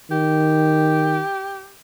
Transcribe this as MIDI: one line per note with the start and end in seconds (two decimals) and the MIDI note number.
0.11 1.21 51
0.11 1.72 67